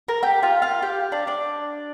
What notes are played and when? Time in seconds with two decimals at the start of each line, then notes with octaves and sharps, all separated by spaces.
0.08 A#4 A#5
0.23 G4 G5
0.43 F4 F5
0.62 F4 F5
0.82 G4 G5
1.12 D4 D5
1.27 D4 D5